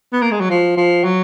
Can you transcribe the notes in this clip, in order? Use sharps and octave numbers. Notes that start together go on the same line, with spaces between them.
B3
A#3
G#3
F#3
F3
F3
F#3